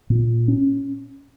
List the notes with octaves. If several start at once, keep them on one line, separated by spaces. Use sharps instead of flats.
A#2
C#4